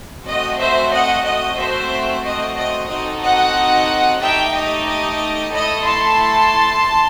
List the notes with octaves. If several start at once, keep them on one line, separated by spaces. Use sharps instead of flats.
A3 C4 F#4 D#5
C5 E5
D#5 F#5
D#5
A3 C4 F#4 C5 E5
D#5
D#5
C4 D#4 F#4 A4 D#5
D#5 F#5
A3 D#4 G4 E5 G5
D#5
D#5
A3 E4 A4 D#5
A5 C6